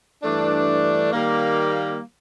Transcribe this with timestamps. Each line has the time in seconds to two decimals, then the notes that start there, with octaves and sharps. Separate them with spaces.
0.23 G2 E3 A3 D4
1.12 D#3 G3 A#3